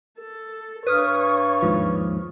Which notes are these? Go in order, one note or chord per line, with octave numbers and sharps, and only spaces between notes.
A4
G2 B4 C#5 D#6 F6
D#2 G#2 F3